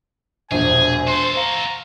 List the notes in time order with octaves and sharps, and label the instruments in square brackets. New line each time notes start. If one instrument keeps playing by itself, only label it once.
[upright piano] E1 A#1 [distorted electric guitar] G#4 [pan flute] C5 [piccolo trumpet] G#5
[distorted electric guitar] F#4 A4 [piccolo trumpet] C6
[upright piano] F5 [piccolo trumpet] A#5